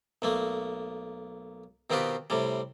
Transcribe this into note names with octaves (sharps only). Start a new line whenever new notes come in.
B1 A3 A#3
B2 D#3 C4 F4 G4 B4
A2 C3 G3